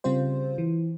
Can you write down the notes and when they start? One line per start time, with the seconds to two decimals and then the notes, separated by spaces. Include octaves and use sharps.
0.04 C#3 G3 C4 F4 C5
0.58 E3